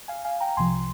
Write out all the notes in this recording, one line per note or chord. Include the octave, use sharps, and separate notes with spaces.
F5 G#5
F5 G#5
G5 A#5
C2 C3 F3 G#5 C6